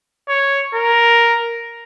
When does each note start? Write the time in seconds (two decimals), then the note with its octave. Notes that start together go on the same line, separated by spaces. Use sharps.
0.28 C#5
0.74 A#4